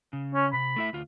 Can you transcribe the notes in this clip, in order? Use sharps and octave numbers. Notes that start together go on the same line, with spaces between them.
C#3
C#4
C3 B5
A3 E4 E5
D2 F4